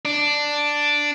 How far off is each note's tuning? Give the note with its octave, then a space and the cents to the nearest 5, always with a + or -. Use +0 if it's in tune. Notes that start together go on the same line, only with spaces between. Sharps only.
D4 +0 D5 +0